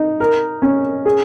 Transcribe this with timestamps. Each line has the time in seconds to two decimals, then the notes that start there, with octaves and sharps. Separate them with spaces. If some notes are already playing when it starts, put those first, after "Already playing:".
Already playing: D#4
0.20 A#4
0.62 C#4
1.06 G#4